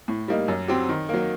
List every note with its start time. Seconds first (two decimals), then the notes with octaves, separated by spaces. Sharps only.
0.08 A2
0.28 G3 A#3 D#4
0.48 F#2
0.68 F#3 C4 G4
0.89 D#3
1.09 F#3 A#3